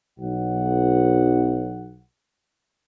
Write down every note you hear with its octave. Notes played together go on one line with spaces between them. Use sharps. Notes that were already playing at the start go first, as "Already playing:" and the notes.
B1 F#5